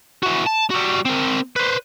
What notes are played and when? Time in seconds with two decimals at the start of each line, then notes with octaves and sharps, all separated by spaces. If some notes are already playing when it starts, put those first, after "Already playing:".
0.23 E3 F#4
0.46 A5
0.70 G3 F#4
1.05 C4 A#4
1.56 B4 C5